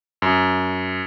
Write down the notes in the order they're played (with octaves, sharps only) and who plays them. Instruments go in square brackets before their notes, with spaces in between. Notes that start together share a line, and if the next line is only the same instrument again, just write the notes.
[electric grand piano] F#2